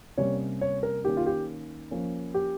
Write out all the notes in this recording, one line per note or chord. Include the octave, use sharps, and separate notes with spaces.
C3 G3 A#3 C#4 C#5
C#5
A#4
D#3 A#3 C#4 G4
F4
G4
F3 A#3 C#4
G4